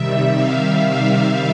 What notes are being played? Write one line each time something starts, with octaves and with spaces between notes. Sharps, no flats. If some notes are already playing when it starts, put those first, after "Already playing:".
Already playing: C3 D#3 G3 E5
F5
F5